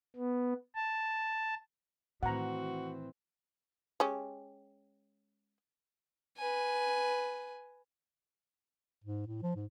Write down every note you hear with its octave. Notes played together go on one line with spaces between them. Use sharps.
B3
A5
A2 D#3 E3 C4 F#4 F#5 A#5
G#3 C#4 G4
B4 G#5
G#2
A2
F3
G#2